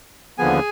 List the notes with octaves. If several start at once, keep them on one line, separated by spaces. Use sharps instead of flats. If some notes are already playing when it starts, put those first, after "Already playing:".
D#2 D3 F3 B3 G#4 G#5